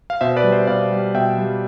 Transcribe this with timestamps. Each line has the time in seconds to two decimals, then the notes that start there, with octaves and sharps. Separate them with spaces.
0.10 F5
0.21 B2 C5 E5
0.36 B4 D5
0.44 G3
0.52 C5 E5
0.67 B2 D5 F5
0.91 G3
1.14 B2 E5 G5
1.38 G3